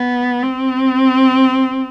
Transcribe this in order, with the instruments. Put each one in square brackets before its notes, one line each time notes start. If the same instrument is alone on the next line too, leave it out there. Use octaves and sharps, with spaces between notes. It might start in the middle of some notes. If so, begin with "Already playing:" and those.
Already playing: [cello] B3
C4